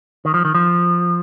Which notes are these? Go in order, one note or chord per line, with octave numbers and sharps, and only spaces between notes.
D#3
F3
D#3
F3